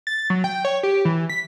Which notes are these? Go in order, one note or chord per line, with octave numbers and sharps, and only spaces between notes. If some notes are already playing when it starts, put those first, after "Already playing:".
A6
F#3
G5
C#5
G4
E3
B6